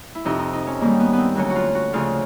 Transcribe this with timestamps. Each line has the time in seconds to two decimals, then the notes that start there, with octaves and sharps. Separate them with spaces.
0.15 E4
0.25 F2 C3 F3 D#4
0.39 D#4
0.53 D#4
0.67 C#4
0.81 G#2 D#3 G3 A#3
1.00 B3
1.13 B3
1.18 C4
1.35 D2 D3 F#3 C#4
1.50 F#4
1.56 F4
1.75 F#4
1.93 D2 C#3 F3 F4